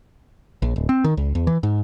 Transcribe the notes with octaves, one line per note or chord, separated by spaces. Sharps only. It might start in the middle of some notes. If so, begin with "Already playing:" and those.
A#1
D1
C4
D#3
C#2
E2
E3
G#2